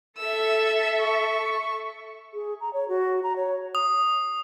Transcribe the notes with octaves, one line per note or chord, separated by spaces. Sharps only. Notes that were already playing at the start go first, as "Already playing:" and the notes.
A4 E5 E6
C#6
G#4
A#5
C#5
F#4
A#5
C#5
D#6